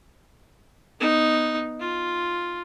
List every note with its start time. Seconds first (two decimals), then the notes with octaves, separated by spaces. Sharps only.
1.00 B3 D#4
1.80 F4